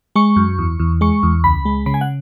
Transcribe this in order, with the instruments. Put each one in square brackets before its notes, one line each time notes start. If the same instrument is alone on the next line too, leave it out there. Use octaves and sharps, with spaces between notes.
[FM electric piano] G#3 C#6
F#2
E2
E2
G#3 C#6
E2
C#2 B5
G#3
C#3 B5
G#5
F#5